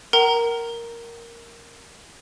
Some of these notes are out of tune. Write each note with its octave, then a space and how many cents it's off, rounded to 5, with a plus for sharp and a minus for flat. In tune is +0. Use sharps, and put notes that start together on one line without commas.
A#4 +0 F#5 +40 A#5 +0